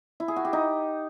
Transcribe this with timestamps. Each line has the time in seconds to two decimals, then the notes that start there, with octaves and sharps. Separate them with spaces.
0.20 E4
0.28 G#4
0.36 F#4
0.45 G4
0.53 D#4